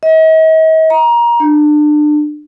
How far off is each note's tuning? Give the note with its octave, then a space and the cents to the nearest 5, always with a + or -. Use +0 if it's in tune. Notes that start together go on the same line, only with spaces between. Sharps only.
D#5 +45
A#5 +20
D4 +30